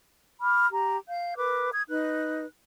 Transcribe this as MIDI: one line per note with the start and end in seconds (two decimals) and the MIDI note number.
0.41 0.67 83
0.41 0.67 86
0.41 0.67 89
0.72 0.98 67
0.72 0.98 82
1.09 1.34 77
1.09 1.34 91
1.37 1.69 70
1.37 1.69 71
1.37 1.69 86
1.72 1.82 87
1.72 1.82 92
1.89 2.46 63
1.89 2.46 71
1.89 2.46 90